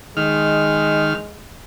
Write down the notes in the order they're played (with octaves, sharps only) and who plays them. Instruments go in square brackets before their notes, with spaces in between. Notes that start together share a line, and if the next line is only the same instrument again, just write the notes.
[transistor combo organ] D#3 F6 [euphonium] G#3